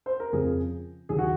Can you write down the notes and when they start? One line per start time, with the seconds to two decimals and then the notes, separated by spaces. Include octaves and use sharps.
0.06 C5
0.20 A#4
0.33 F2 C#3 F3 C4 G#4
1.09 D#2 C#3 F#3 G#4
1.18 F#4